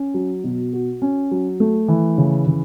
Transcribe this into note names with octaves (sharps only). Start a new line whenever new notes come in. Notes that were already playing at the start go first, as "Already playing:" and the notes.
Already playing: C#4
F#3
B2
F#4
C#4
F#3
A3
E3
C#3
C#3